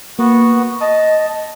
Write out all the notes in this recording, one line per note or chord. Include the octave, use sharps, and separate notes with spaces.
A#3 B3 F#4
D#5 A5 D#6